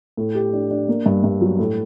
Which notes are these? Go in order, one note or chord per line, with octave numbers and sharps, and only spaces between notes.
A2
G4
D4
D4
A#3
G2
G2
F#3
A2